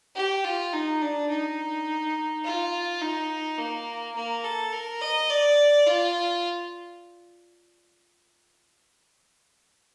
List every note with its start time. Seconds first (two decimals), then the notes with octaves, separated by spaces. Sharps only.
0.16 G4
0.44 F4
0.73 D#4
1.02 D4
1.30 D#4
2.44 F4
3.01 D#4
3.58 A#3
4.16 A#3
4.44 A4
4.73 A#4
5.02 D#5
5.30 D5
5.87 F4